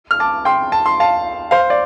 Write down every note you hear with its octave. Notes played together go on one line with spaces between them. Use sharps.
F6
A5 D6
G5 C6
A5
C6
F5 A5
C5 F5
D5